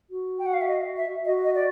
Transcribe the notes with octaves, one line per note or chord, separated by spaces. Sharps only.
F#4
G5
F#5
F5
E5
D#5
E5
F#4 D#5
D#5
D5